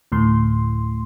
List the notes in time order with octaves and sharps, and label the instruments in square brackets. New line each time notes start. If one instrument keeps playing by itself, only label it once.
[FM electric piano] D2 A2 C6